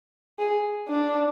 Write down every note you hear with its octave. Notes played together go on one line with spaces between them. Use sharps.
G#4
D4